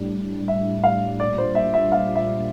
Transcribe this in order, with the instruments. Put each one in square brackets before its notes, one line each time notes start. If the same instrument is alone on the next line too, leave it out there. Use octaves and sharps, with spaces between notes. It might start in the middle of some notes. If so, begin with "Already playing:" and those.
Already playing: [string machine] A2 G3 D4
[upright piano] E5
F5
[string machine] A#2 G3 D4 F4 [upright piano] D5
[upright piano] C5
E5
E5
F5
E5